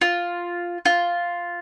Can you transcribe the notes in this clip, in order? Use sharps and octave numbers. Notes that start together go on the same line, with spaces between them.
F4
F4